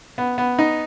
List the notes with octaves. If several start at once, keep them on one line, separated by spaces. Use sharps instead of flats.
B3
B3
D#4